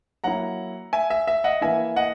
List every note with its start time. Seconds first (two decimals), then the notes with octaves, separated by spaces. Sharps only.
0.24 F#3 A#3 E4 F#5 A#5
0.93 E5 G#5
1.10 E5
1.28 E5
1.44 D#5 F#5
1.61 E3 A#3 E4 E5 G#5
1.96 D#5 F#5